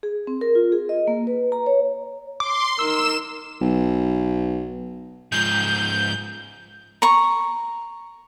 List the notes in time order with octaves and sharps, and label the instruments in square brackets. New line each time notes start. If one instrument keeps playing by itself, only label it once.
[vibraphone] G#4
C4
A#4
F4
G#4
D#5
A#3
B4
A#5
C#5
[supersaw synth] C6 [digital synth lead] D6
[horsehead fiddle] D#4 A#4 [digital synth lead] E6 [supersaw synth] E7
[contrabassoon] B1
[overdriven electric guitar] G#2 F3 [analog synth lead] G6
[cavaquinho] A#5 C#6